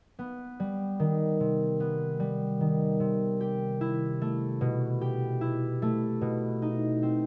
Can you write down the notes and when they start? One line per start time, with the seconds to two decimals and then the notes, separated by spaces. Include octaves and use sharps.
0.19 B3
0.60 G3
0.99 D#3
1.40 C3
1.80 B3
2.20 G3
2.61 D#3
3.00 C3
3.40 G4
3.81 E4
4.21 A3
4.61 B2
5.01 G4
5.41 E4
5.82 A3
6.21 B2
6.62 D#4
7.02 C4